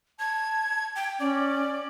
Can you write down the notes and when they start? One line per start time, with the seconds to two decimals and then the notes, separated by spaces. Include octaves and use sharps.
0.19 A5 G#6
0.95 G5
1.20 C#4 D5